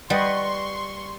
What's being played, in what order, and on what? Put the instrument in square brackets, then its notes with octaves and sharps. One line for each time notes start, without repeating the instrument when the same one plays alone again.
[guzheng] G3 [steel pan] B4 D#5 F#5 [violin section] C6 C#6